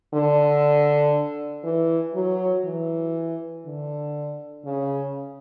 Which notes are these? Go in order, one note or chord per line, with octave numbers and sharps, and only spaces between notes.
D3
E3
F#3
E3
D3
C#3